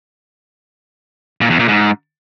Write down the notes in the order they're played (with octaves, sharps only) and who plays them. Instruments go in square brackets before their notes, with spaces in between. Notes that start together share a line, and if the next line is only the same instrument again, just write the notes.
[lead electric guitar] A#2
E2
A#2
G#2